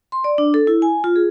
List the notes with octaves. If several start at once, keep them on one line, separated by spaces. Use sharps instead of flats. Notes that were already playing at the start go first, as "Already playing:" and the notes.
C6
D5
D4
A4
E4
G#5
F4
G#4